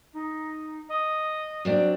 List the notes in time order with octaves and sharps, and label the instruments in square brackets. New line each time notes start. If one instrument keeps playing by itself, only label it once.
[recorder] D#4
D#5
[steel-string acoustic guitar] F#3 C4 D4 [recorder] D5